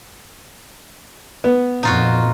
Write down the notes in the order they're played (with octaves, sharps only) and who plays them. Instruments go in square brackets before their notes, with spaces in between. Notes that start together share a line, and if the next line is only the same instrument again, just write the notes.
[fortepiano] B3
[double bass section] F2 A#2 [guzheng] D#4 F4 F#4